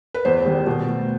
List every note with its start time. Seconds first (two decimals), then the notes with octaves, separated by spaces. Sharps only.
0.14 B4
0.25 E2 C5
0.46 D#3 G3
0.67 B2
0.87 A3